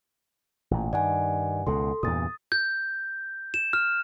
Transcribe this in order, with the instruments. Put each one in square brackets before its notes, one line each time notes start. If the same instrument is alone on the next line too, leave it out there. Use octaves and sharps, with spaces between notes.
[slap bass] A1 A#2
[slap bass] G2 D#3 [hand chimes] D5 F#5 G#5
[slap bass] C#2 B2 [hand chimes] A4 C6
[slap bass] E2 G2 A#2 [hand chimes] D#6 A6
[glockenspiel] G6
E7
F6